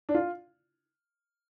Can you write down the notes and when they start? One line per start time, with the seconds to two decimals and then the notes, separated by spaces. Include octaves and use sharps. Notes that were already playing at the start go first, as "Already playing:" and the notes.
0.09 D4
0.15 F4